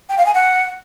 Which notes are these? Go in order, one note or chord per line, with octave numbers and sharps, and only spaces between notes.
G5
F5
G#5
F#5